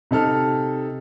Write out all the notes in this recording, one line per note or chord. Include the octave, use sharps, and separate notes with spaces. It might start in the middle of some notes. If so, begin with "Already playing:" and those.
C3 D#4 A4 F6